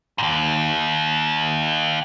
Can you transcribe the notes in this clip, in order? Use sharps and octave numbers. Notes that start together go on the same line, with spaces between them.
D#2 G#2